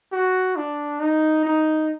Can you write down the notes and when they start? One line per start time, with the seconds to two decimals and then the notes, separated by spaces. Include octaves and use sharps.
0.12 F#4
0.56 D4
1.00 D#4
1.45 D#4